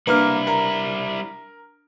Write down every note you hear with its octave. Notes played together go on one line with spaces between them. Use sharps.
G3 A#3 D4 E4 B4 F6
A#4